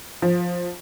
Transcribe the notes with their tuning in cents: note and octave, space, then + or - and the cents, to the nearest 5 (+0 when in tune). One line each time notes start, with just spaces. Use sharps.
F3 +10